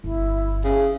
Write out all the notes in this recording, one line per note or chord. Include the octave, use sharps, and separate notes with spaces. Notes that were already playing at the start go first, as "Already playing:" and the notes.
G1 E4
C#3